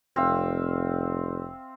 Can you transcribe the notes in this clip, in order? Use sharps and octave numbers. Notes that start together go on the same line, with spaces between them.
F1 C4 E5 F5